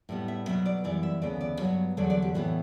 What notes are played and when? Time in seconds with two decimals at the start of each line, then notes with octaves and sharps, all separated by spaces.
0.09 A2 G3 B3
0.28 E5
0.46 B2 F#3 B3 E5
0.66 D5
0.84 F#2 E3 G3 B3 D5
1.03 E5
1.22 D2 C#3 E3 B3 D5
1.41 D5
1.59 G2 F#3 B3 C#5
1.97 E2 D3 F#3 A3 D5
2.10 D5
2.22 G4
2.35 A2 E3 B3 F#4